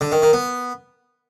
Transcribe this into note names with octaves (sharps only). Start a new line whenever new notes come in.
D3
D#3
D#3
B3